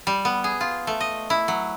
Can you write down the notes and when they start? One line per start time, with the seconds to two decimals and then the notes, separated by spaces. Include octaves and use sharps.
0.07 G3
0.25 B3
0.44 G#4
0.61 F4
0.87 A3
1.01 D#5
1.30 E4
1.48 F#3